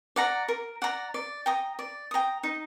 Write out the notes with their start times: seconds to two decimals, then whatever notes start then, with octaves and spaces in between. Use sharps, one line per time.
0.16 D5 F#5 A#5
0.49 A#4
0.82 D5 F#5 A#5
1.14 D5
1.46 G5 A#5 D#6
1.79 D5
2.11 G5 A#5 D#6
2.43 D#4